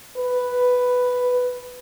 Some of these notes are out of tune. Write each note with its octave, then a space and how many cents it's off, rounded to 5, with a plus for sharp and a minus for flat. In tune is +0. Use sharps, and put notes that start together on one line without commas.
B4 +5